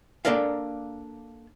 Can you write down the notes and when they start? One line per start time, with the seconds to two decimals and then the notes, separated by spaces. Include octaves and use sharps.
0.25 A#3 D4 A4 A#4 D5 F5